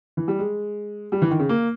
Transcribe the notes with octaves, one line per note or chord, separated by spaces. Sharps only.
E3
G3
G#3
G3
E3
D#3
C#3
A#3